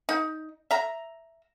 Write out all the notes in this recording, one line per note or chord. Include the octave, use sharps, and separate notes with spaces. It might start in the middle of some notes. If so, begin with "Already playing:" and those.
D#4
E5 A#5